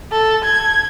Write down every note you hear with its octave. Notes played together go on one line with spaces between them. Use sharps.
A4
G#6